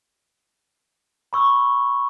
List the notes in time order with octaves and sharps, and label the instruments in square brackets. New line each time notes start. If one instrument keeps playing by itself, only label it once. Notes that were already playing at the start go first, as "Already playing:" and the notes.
[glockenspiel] B5 C#6 E6